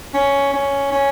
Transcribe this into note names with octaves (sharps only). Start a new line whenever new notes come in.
C#4
C#4
C#4